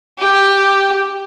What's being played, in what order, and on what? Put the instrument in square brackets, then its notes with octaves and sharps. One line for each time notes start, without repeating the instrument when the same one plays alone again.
[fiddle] G4